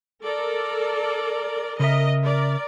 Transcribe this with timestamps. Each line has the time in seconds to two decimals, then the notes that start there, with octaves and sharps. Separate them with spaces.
0.22 A4 A#4 D5
1.80 C#3 A#4 D#5 E5
2.24 A#4 D5